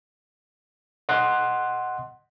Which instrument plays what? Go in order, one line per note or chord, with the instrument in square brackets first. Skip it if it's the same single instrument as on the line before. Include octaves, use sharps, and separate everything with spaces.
[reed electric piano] D#5 F#5 C6 F#6